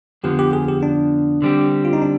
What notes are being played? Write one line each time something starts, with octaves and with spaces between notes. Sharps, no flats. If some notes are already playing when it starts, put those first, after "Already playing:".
F2 D3 F3 B3 G4
G4
G#4
G4
D4
D3 G3 C4 G4
F4
D#4
D4